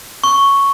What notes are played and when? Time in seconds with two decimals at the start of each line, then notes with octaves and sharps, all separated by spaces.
0.24 C#6